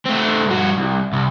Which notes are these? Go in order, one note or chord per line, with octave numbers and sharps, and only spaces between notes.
A3 C4
G2 F#4
C2
C2